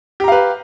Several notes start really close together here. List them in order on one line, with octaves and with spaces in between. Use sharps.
G4 A#5 F5 B4